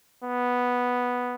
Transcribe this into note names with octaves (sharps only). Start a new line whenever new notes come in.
B3